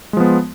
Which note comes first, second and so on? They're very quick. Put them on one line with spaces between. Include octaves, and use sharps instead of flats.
G#3 F3 B3